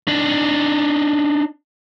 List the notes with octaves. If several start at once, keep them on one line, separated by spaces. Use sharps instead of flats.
D4 D#4